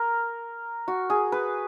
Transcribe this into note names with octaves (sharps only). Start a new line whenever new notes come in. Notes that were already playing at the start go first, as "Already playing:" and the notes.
Already playing: A#4
F#4
G#4
B4